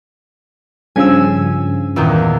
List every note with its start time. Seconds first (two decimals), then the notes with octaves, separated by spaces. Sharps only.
0.96 G2 C#3 F3 G#5 E6
1.96 E2 A#2 D#3